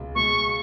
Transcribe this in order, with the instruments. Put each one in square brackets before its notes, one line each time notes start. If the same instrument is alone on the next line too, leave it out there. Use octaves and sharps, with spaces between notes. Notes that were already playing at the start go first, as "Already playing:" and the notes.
Already playing: [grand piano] C#2 B2 G#3
[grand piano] B2 G#3 [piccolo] C#6